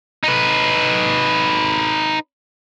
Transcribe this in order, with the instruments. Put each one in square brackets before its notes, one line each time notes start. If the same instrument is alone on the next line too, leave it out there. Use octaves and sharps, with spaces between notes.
[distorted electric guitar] D#4 B4